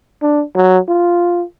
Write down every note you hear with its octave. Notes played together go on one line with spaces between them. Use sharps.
D4
F#3
F4